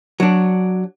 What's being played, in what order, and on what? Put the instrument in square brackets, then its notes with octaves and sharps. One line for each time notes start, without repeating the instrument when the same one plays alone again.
[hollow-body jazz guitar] F#3 D4